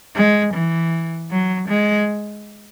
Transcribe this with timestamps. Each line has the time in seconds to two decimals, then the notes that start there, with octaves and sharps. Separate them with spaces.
0.16 G#3
0.54 E3
1.31 F#3
1.69 G#3